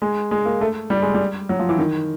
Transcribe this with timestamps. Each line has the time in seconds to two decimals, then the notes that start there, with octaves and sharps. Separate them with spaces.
0.02 G#3
0.31 G#3
0.46 A#3
0.61 A3
0.90 G3
1.02 G#3
1.14 G3
1.49 F#3
1.59 F3
1.69 E3
1.79 D#3